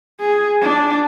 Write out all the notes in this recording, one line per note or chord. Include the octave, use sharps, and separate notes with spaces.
G#4
D4